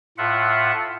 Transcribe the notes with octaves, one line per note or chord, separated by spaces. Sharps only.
A2 F4 E5 F#5